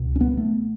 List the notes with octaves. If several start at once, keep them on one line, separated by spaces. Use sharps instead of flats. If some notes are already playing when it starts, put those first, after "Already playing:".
Already playing: C#2 B2
C#4
B3
A3